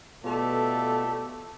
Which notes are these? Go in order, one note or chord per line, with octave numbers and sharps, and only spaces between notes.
B2 A3 B3 F4 G4 A4 D5